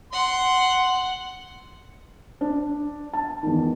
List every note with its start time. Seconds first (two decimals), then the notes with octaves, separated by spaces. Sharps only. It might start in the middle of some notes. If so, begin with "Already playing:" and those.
0.13 F#5 C6
2.41 D4
3.13 A5
3.43 E2 D#3